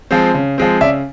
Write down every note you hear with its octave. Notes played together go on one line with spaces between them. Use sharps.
F3 G#3 C4
C#3
F3 G#3 C4
C#3 D5 E5